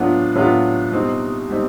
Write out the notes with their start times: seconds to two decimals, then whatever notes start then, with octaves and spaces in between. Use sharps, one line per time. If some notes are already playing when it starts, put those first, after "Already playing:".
Already playing: A2 F#3 B3 D4 F4
0.35 A2 F#3 B3 D4 F4
0.92 B2 G3 C4 D#4
1.48 B2 G3 C4 D#4